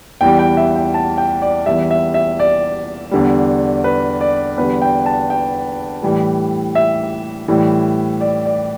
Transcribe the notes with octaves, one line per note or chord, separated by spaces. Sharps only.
E2 E3 G3 G5
G5
E5
G5
A5
G5
D5
E2 E3 G3 E5
E5
E5
D5
E2 D3 G3
B4
D5
E2 D3 G3 B4
G5
A5
G5
A2 E3 G3
E5
A2 E3 G3
D5
D5